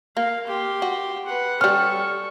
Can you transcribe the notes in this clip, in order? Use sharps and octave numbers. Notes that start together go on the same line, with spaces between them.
A#3 F5
G4 C6
F#4
B4 F#5
G3 C#4 A4 C#6 F6